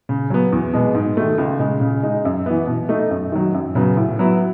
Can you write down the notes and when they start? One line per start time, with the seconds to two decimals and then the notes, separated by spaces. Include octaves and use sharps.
0.09 C#3
0.30 F#3 B3
0.52 E2
0.73 B2 G#3 B3
0.95 G#2
1.17 D#3 A3
1.38 C#2
1.59 C#3 G#3
1.81 C#3
2.03 G#3 D#4
2.25 F#2
2.46 E3 B3
2.67 B2
2.89 A3 D#4
3.11 F#2
3.32 D#3 F#3
3.54 F#2
3.75 C#3 F#3 B3
3.97 A2
4.19 F#3 B3 E4